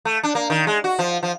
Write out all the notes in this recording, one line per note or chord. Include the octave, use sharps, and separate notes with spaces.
A3
D4
A#3
D#3
G#3
F#4
F3
F3